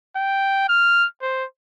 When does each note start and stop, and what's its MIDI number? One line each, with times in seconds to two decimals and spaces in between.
0.16 0.67 79
0.69 1.06 89
1.21 1.45 72